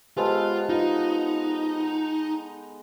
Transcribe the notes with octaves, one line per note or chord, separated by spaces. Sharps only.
G#3 B3 F4 G4 A4 B4 C5
D#4 F4